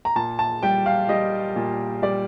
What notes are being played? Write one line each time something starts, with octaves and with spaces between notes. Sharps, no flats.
A#5
A#2 A5
A5
G3 G5
F5
G3 D#5
A#2
G3 D5